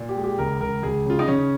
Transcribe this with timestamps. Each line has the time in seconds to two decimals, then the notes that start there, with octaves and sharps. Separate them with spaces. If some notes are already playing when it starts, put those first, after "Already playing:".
Already playing: A#2
0.09 G4
0.16 G#3
0.24 G4
0.38 C#2 A#4
0.61 C#2 A#4
0.82 C#2 G#4
1.05 C#3 F4
1.19 D#4
1.27 C#3 C#4